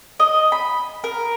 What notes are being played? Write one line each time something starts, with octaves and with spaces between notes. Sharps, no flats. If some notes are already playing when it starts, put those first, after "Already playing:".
D#5
B5
A#4